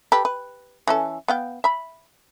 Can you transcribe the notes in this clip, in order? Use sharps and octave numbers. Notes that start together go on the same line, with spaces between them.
G4 A4 B4
B4
E3 C#4 A4
B3 F5 G5
E5 B5